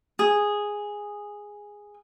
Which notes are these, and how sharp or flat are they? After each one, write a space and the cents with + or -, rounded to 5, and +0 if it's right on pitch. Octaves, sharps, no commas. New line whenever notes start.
G#4 -5